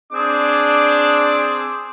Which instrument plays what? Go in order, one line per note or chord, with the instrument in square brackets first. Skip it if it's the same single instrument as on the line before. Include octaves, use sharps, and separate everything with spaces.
[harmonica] C4 G#4 D6 [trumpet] D4